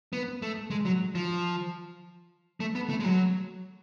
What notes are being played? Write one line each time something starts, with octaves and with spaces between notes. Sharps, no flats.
B3
A3
G#3
F#3
F3
A3
B3
A3
G#3
F#3